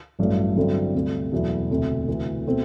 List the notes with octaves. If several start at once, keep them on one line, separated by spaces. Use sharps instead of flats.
A1 G2 F#3 A3 E4
G2 D3 F#3 C4 E4
D2 C3 G3
E2 B2 F#3 A3 E4
E1 D2 C3
D2 C3 E3 A3
B2 A3 C4